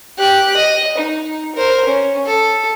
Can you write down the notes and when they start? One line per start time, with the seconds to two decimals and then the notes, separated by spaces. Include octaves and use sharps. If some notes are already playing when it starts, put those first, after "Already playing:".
0.19 G4 F#6
0.56 D#5
0.98 D#4
1.55 A#4 C5
1.85 C#4
2.26 A4